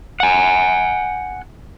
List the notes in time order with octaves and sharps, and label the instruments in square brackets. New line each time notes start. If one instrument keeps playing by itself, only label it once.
[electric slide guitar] F#5 G#5